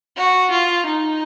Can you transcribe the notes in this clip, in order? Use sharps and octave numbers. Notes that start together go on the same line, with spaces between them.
F#4
F4
D#4